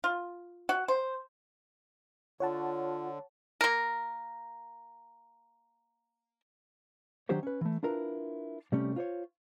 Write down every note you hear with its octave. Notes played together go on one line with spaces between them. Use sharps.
F4
F#4
C5
D3 F4 C#5 F#5 A5
A#3 A#4
D#3 F#3 D4 G4 C5 C#5
C#4 B4
E3 A3
D4 E4 F4 A#4 B4
C3 G3 A3 C#4
F4 C5 C#5